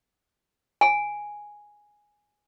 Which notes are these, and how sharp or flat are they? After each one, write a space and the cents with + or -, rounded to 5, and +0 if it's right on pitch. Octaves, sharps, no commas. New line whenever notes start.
G#5 +0